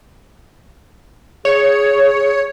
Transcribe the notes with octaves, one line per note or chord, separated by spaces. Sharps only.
G#4 C#5